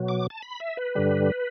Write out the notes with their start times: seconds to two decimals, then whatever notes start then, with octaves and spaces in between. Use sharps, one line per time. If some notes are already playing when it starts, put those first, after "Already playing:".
Already playing: B2 F#3
0.08 D6
0.30 A5
0.43 B5
0.60 E5
0.77 B4
0.95 G2 D3 G3